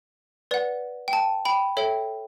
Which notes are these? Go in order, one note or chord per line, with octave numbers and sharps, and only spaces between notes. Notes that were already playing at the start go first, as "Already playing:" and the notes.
B4 D5 F#5
G5
A5
G5 B5
A4 C#5 E5 G5